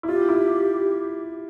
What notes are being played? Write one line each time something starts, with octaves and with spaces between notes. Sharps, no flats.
E4
F4 G4
E4